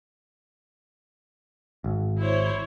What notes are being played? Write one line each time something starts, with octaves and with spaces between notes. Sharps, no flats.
G#1
E4 C5 C#5